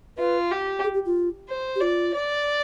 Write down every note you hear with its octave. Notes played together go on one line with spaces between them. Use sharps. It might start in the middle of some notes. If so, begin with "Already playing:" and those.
F4 B4
G4
G#4
G4
F4
C5
G4
F4 D5
D5